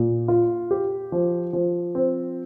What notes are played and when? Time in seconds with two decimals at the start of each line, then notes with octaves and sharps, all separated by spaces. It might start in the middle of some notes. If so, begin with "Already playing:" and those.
Already playing: A#2
0.28 F4
0.71 G4
1.12 F3
1.53 F3
1.95 C4